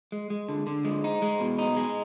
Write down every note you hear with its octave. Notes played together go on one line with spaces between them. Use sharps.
G#3
G#3
D3
D3
G#3
D#4
G#3
B2
D#4
G#3